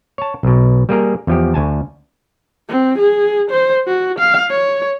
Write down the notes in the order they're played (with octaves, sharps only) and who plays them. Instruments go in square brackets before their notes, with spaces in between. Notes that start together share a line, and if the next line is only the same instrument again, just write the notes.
[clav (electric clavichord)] C#5 A5
B1 B2
G3 A#3 G#4 A#4
E2 F3 G4
D2 G#5 A5
[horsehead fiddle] C4
G#4
C5
F#4
F5
C#5